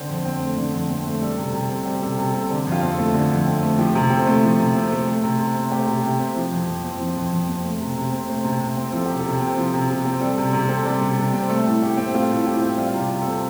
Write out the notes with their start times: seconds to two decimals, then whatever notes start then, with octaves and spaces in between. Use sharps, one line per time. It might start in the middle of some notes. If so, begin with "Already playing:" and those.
Already playing: D3 C4 C5
0.10 F2
0.25 C4
0.42 A3
0.57 D3
0.74 F2
0.90 C4
1.06 A3
1.21 G3 A4
1.38 C3 A4
1.53 C3
1.70 C4
1.85 G3 G4
2.02 C3 A4
2.18 C3 A4
2.34 C4 A4
2.50 D3 G4
2.66 F2
2.72 F4
2.83 C4
2.93 A4
2.98 A3
3.14 D3
3.31 F2
3.47 C4
3.63 A3
3.78 F3 G4
3.95 C3
4.10 C4 A4
4.27 A3
4.43 F3
4.60 C3
4.75 C4
4.92 A3
5.08 A3
5.23 C3
5.39 C3
5.55 C4
5.71 A3 G4
5.87 C3
6.03 C3
6.19 C4
6.36 F3
6.51 F2
6.68 F2
6.84 C4
7.00 F3
7.16 F2
7.33 F2
7.48 C4
7.64 A3
7.81 C3
7.96 C3
8.12 C4
8.28 A3 C5
8.44 C3
8.61 C3
8.77 C4
8.92 F3 A4
9.06 C3 G4
9.19 A4
9.26 C3
9.41 C4
9.57 F3
9.74 C3
9.90 C3
10.05 C4
10.21 G3 A4
10.38 C3
10.53 C3 G4
10.69 C4 A4
10.85 G3 D5
11.01 C3
11.18 C3
11.33 C4
11.49 A3 A4
11.66 A2
11.82 A2 G4
11.97 C4
12.14 A3 F4
12.30 A2 A4
12.46 A2 G4
12.62 C4
12.78 G3 F4
12.94 C3
12.99 G4
13.11 C3
13.22 C4 A4